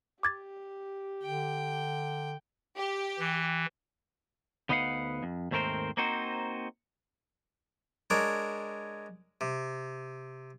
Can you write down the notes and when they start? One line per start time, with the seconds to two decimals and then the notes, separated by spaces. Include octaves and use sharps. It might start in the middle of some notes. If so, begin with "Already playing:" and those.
0.23 G4 D6 G#6 A6
1.23 D3 G5
2.76 G4
3.19 E3
4.69 D2 B3 D#4 B4 F5 F#5
5.23 F2
5.51 D#2 G#2 A3 C4 A#4 C5
5.97 A#3 C4 D#4 F#4 C5
8.10 G#3 D4 A#4 C#5
9.41 C3